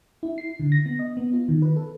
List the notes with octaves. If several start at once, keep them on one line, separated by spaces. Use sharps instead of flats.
E4
C7
D3
A#6
B3
D#5
B3
F4
D#3
B4
A4